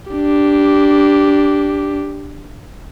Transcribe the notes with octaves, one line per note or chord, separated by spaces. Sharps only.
D4 G4